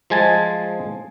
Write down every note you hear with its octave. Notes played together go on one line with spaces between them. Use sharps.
F3 G#3 G#5 A5